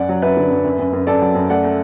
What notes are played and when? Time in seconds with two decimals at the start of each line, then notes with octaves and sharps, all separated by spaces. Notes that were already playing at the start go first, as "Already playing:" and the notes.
Already playing: F#2 D5 F#5
0.09 F#3
0.22 F#2 B4 E5
0.37 D3
0.51 F#2
0.64 F#2
0.79 F#2
0.93 F#2
1.07 F#2 A4 D5
1.22 F#3
1.35 F#2
1.50 A3 D5 F#5
1.64 A3